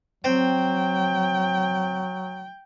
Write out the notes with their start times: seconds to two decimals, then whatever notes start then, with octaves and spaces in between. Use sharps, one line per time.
0.24 F#3 C4 G5